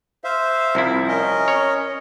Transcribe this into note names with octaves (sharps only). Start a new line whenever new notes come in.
C5 E5 F5
C2 F3 E4
C#4 A#4 D#5
C#5